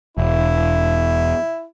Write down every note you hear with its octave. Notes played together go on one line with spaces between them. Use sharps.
E1 E4